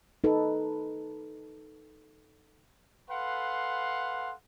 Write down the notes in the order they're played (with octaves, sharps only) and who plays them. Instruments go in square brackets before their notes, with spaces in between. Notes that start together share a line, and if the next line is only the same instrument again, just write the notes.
[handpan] D#4 A4 B4
[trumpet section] A4 B4 F5 F#5 C6